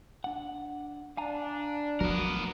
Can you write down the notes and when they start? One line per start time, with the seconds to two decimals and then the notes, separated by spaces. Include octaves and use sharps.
0.24 D4 F#5
1.17 D4 F5 G#5 A#5
2.01 F3 F#3 A3 B3 F#4 A#4